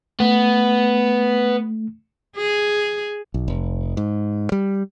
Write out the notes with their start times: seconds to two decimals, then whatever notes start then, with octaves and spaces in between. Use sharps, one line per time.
0.20 A3 B3
2.37 G#4
3.34 B1
3.48 F1
3.97 G#2
4.52 G3